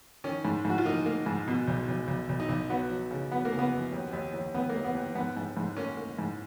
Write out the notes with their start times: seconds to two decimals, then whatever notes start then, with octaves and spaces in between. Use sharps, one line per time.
0.24 D#3 C#4
0.45 G#2
0.65 G#2 F#4
0.78 F4
0.85 A#3 D#4
1.06 A#3
1.26 G#2
1.48 B2
1.68 B1
1.88 B1
2.08 B1
2.29 B1
2.40 D#4
2.49 B1
2.70 F#3 B3
2.90 F#3
3.11 C#3
3.32 F#3 B3
3.45 A#3
3.52 C#3
3.59 B3
3.72 F#2
3.92 D#2
4.13 D#2
4.33 D#2
4.54 D#2 B3
4.69 A#3
4.75 D#2
4.84 B3
4.95 D#2
5.15 G#2 B3
5.37 G#2
5.57 G#2
5.77 A#3 C#4
5.97 A#3
6.19 G#2